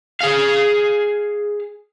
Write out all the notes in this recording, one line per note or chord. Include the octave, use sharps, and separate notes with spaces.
G#4 F5